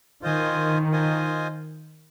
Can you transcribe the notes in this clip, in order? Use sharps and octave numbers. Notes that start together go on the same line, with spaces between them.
D#3 F4 C5 D#5 G#5
F4 C5 D#5 G#5